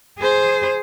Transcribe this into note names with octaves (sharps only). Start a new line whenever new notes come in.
G#4 C5